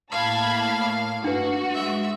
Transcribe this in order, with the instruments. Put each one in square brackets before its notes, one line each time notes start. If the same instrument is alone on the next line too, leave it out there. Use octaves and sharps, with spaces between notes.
[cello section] A2 A#3 [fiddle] F5 [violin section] A5 B5 G#6
[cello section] G2 [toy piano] D4 B4 [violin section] F#4
[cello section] G#3 [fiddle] E5